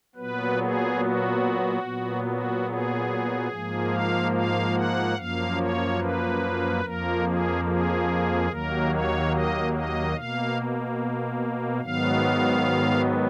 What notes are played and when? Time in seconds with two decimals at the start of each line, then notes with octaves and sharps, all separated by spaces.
0.15 A#2 F#3 B3 B4
0.57 G#4
0.99 F#4
1.82 A#2 F#3 B3
2.23 F#4
2.65 G#4
3.48 G#2 F3 A#3
3.90 F5
4.32 F5
4.74 F#5
5.15 F#2 F3 A#3 F5
5.56 C#5
5.99 B4
6.81 F2 F3 A#3 A#4
7.23 G#4
7.64 G#4
8.47 D#2 D#3 F#3 A#3 A#4
8.89 C#5
9.31 D#5
9.72 D#5
10.14 B2 A#3 F5
11.81 G#2 D#3 F#3 B3 F5